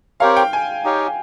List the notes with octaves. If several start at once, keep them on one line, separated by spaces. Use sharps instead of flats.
C4 G4 A#4 C#5 F5
G5
G#5
D#4 G4 C#5 F5